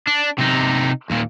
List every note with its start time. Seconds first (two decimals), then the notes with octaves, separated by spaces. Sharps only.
0.07 D4
0.38 C3 D#4
1.11 D#2 A#2